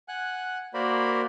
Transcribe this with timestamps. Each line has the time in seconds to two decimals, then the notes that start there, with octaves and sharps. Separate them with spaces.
0.08 F#5 G#5 F#6
0.74 A#3 F#4 A#4 C5 D5 B5